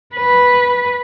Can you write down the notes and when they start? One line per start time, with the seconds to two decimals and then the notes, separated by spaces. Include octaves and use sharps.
0.16 B4